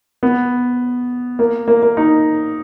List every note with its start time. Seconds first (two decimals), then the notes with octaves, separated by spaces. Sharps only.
0.23 B3
1.39 A#3
1.68 A#3
1.83 A#3
1.97 D#4